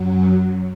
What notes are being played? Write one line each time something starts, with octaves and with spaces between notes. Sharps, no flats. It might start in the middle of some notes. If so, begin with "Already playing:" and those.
Already playing: F#2 F#3
C#4